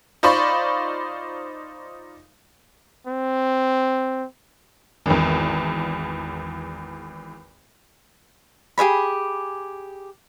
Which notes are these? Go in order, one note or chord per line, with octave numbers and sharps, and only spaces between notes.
D#4 F4 C5 D5 B5 C#6
C4
G#1 E2
G4 G#4 C#5 B5